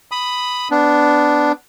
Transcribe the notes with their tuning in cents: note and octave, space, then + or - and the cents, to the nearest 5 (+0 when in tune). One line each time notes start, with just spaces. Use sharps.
B5 +5 D#6 +0
B3 +15 D4 +0